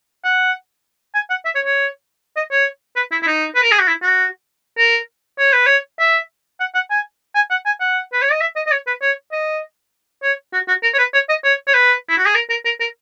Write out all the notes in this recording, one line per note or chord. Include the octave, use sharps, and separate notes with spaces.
F#5
G#5
F#5
E5
C#5
C#5
D#5
C#5
B4
E4
E4
D#4
B4
A#4
G#4
F#4
E4
F#4
A#4
C#5
B4
C#5
E5
F#5
F#5
G#5
G#5
F#5
G#5
F#5
B4
C#5
D#5
E5
D#5
D#5
C#5
B4
C#5
D#5
C#5
F#4
F#4
A#4
C#5
B4
C#5
D#5
C#5
C#5
B4
E4
F#4
G#4
A#4
A#4
A#4
A#4